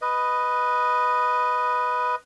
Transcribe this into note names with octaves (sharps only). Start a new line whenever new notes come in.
B4 D#5